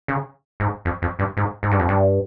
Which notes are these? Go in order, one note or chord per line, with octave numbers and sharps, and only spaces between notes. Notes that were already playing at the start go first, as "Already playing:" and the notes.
C#3
G#2
F2
F2
G2
G#2
G#2
G2
F2
G2